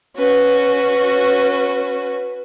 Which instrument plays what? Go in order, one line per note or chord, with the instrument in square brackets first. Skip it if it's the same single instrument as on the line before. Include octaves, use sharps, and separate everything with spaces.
[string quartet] C#4 F#4 B4